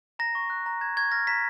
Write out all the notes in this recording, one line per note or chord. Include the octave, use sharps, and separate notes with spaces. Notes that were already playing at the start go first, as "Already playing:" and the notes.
A#5 A#6
C#6
F#6
A#5
A#5 G#6
C#6 G#6
F6 A#6
A#5 B6